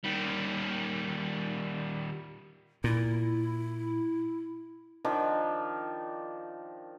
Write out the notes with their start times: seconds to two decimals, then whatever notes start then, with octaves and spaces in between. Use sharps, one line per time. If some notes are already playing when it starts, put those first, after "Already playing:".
0.04 D#3 G3
2.84 A#2 E4
5.05 D#3 F3 D4